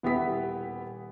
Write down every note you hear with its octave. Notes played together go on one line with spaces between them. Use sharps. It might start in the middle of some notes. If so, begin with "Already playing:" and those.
D#1 B3 E4 G4 B6